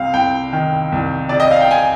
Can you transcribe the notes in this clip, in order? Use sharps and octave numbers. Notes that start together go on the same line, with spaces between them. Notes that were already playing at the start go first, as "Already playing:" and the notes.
Already playing: C2 C3 F5
C2 G5
D#3
C2
C3 D5
D#5
F5
G5
G#5